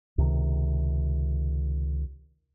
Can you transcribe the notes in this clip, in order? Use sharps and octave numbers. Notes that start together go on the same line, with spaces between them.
C#2 C3 D#3